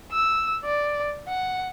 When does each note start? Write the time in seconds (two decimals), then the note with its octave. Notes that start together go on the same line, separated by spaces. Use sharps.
0.11 E6
0.64 D5
1.28 F#5